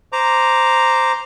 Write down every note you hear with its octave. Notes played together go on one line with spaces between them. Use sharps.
C5 A#5 D6